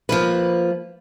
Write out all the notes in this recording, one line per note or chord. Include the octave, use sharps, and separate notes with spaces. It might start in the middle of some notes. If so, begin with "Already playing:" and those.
F3 A#3 B4